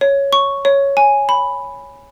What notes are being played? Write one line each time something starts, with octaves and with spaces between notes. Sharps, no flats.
C#5
C#6
C#5
G#5
B5